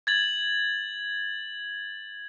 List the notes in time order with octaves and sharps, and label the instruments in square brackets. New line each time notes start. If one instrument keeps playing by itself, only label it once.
[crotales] G#6 A6 F#7